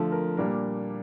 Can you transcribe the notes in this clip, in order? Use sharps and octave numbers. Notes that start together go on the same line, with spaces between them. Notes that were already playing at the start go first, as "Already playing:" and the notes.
Already playing: D3 F3 A3 A4
A#4
A#2 G3 A#3 D4 A#4